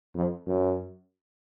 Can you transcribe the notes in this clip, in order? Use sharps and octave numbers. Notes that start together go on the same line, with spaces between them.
F2
F#2